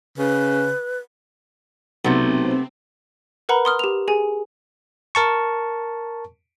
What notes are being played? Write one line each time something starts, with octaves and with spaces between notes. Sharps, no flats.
C#3 B4
B1 C3 A3 B3 C4
A#4 B4 F#5 A#5 B5
C6 D#6 F6
G4 F7
G#4 G#5
A#4 A5 C#6